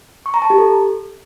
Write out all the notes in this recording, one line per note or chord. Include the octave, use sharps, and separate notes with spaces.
C#6
A#5
A5
G4
A4